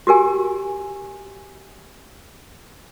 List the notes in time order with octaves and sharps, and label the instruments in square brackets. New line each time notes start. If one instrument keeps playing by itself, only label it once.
[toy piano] F#4 G4 A#4 G#5